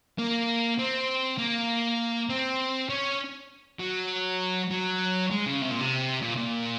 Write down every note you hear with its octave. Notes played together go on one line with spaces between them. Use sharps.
A#3
C4
A#3
C4
C#4
F#3
F#3
G#3
C#3
C3
A#2
C3
A#2
A#2